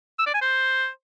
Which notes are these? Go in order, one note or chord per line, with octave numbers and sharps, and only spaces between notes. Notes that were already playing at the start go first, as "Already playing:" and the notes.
E6
D5
G#5
C5